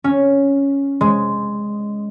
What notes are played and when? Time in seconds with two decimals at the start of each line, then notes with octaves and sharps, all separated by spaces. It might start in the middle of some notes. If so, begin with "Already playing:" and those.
0.04 C#4
1.01 G#3